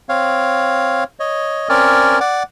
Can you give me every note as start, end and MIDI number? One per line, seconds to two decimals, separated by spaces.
0.09 1.04 60
0.09 1.04 73
0.09 1.04 77
1.20 1.69 73
1.20 1.69 75
1.69 2.19 60
1.69 2.19 61
1.69 2.19 70
1.69 2.19 73
1.69 2.19 74
2.20 2.43 74
2.20 2.43 78
2.20 2.43 86